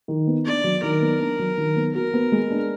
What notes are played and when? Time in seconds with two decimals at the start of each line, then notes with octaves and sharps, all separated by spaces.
0.08 D#3
0.27 B3
0.46 D4 D5
0.64 F#3
0.83 D#3 A#4
1.01 B3
1.19 D4
1.39 F#3
1.58 D#3
1.76 B3
1.94 F#4 A#4
2.14 B3
2.32 G#3
2.51 D4